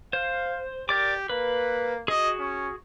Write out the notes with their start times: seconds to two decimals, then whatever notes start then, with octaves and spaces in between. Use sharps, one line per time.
0.13 C5 F5
0.89 G4 A#4 D5 D6
1.30 A#3 B4
2.08 F#4 G#4 D#5
2.39 C#4